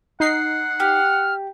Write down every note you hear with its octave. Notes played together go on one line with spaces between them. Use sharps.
D#4 F#5 C7
G4 F6